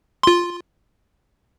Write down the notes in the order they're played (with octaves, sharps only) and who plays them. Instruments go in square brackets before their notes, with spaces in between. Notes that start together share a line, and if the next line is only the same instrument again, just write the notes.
[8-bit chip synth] F4 C6